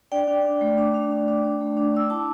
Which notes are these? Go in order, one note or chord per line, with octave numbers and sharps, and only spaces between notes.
D4 D5 G5
D4
D4
A3
D4
D4
D4
D4
D4
A3
D4
D4 E6
E4 A5 D6